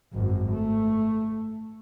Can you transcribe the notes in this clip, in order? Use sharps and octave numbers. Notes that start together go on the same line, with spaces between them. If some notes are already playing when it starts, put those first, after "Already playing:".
G#1 F#2
A3